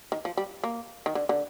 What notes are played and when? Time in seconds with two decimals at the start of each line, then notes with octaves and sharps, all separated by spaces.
0.12 D#3
0.25 F3
0.37 G3
0.64 A#3
1.06 D#3
1.15 D3
1.29 D3